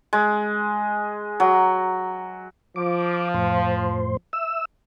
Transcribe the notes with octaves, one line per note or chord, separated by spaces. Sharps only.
G#3
F#3
F3 D6
F2 A2 C5
E5 E6